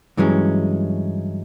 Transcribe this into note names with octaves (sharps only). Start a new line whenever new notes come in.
G2 E3 F#3 G#3 C#4